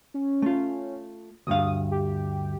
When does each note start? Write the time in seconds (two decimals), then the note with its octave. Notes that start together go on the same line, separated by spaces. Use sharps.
0.14 C#4
0.42 A3 F4
1.47 D2 G2 F5 D#6
1.91 G4